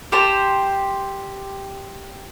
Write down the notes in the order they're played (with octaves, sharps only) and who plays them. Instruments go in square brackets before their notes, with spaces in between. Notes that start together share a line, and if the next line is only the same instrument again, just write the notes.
[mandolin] G4 C5 A5